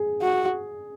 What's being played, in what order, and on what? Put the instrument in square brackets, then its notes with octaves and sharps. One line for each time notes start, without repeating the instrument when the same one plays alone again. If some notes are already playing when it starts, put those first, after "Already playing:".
Already playing: [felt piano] G#4
[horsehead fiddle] F#4